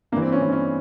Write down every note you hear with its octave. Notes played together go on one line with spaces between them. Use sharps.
G2 E3 A#3
C4
C#4
G2 E3
C#4